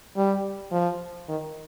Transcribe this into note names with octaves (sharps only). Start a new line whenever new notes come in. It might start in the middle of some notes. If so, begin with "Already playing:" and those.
G3
F3
D#3